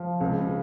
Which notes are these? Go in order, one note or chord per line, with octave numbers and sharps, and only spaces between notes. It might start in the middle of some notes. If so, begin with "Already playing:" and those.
Already playing: F3
C#2
C#3